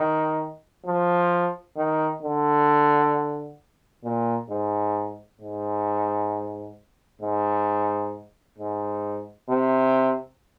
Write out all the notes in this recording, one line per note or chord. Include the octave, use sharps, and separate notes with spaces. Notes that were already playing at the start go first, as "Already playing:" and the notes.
Already playing: D#3
F3
D#3
D3
A#2
G#2
G#2
G#2
G#2
C3